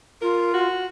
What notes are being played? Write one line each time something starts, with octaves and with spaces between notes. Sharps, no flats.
F4 A#4
F#4